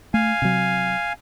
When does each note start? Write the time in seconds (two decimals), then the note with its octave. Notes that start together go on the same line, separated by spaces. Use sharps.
0.14 A3 F5 G#5
0.42 C3 F#3